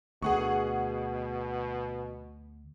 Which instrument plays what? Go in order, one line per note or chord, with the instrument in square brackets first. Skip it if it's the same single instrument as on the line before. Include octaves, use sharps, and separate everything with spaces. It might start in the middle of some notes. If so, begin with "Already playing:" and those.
[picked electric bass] D2 [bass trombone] B2 [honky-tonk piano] G#4 F#5 C#6